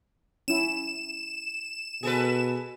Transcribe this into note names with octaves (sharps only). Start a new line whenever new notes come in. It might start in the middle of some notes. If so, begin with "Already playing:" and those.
C#4 E4 E7
B2 G#4 A4 B4